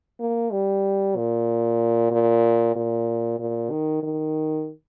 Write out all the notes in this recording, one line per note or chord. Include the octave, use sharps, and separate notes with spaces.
A#3
G3
A#2
A#2
A#2
A#2
D#3
D#3